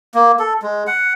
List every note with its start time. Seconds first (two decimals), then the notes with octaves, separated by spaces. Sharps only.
0.14 A#3
0.39 A4
0.62 G#3
0.87 F#5